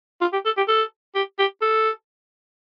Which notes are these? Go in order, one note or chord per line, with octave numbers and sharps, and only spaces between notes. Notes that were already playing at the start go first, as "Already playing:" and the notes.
F4
G4
A4
G4
A4
G4
G4
A4